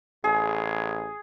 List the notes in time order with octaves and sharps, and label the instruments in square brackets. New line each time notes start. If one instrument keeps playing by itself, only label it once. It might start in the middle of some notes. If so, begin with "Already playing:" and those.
[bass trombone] A1 [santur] G#4